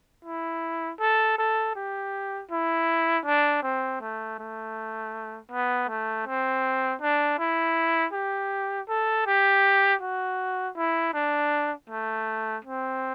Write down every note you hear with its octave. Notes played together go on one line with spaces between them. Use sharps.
E4
A4
A4
G4
E4
D4
C4
A3
A3
B3
A3
C4
D4
E4
G4
A4
G4
F#4
E4
D4
A3
C4